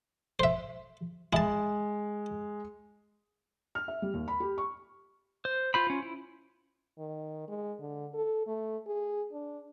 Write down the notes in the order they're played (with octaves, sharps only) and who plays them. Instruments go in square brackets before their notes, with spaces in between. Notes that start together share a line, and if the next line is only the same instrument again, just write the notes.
[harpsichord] C5 E5
[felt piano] G#3 [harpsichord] E4 A5
[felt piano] F6
E5
G3
D#2
B5
G4
C#6
[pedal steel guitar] C5
F4 C5 B5
C#4 F4
E4
[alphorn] D#3
G#3
D3
A4
A3
G#4
D4